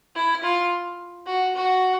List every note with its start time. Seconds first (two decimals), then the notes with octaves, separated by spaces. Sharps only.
0.15 E4
0.44 F4
1.27 F#4
1.56 F#4